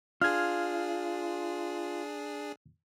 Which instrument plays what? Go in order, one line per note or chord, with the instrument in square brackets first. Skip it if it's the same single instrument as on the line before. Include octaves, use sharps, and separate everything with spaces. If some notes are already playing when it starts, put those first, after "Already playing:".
[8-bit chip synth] D4 G#4 [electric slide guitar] F4 [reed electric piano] F6 G#6